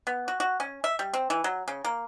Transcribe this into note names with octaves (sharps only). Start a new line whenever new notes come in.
B3
F#4
F#4
C#4
E5
G3
C4
E3
F#3
C#3
A#3